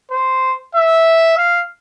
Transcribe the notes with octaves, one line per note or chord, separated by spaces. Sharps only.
C5
E5
F5